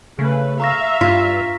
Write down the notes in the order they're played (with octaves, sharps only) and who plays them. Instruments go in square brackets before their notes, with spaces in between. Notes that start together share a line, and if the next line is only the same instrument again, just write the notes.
[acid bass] C#3 [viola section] A3 B4
[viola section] E5 F5 [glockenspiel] A#5 C#6 A#6
[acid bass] G2 [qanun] F4 [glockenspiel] B6